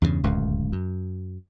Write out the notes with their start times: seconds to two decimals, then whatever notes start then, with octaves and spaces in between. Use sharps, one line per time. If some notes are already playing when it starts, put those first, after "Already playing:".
0.02 E2 G2 A#2 C#3
0.24 D1 C#2 F#2
0.72 F#2